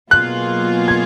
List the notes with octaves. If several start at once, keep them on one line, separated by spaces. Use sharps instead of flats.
B2 F#3 A#3 F4 G#4 F#6
G#6